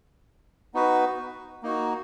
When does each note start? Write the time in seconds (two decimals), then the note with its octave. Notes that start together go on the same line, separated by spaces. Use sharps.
0.74 B3 D#4 F#4 B4
1.63 A#3 D#4 F#4